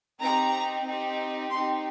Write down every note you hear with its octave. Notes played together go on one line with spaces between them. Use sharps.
C4 D#4 G4 A#5
C4 D#4 G4
C4 D#4 G4 C6